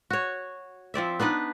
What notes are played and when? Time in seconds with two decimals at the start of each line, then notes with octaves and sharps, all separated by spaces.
0.10 F#4 C#5
0.94 F3 C4 D5 E5
1.20 B3 D4 D#4 B4